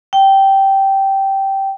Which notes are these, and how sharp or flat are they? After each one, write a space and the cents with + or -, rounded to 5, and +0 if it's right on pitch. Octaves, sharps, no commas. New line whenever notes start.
G5 -10